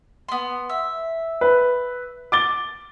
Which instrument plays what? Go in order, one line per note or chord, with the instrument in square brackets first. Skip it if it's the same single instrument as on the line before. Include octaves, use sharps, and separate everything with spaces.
[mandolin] B3 C6
E5
[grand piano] B4
D6 A6 G7